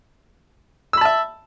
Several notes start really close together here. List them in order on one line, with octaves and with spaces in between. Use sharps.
E6 B5 A5 E5